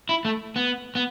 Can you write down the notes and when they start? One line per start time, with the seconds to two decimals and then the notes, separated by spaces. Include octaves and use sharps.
0.09 E4
0.25 A3
0.56 B3
0.95 B3